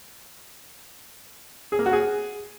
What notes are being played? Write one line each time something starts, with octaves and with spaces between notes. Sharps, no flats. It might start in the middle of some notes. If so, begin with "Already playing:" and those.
G#4
A#3
F#4
G#4